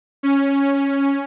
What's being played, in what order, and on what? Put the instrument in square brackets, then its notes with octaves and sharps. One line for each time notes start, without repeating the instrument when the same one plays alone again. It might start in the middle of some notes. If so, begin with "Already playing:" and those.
[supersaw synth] C#4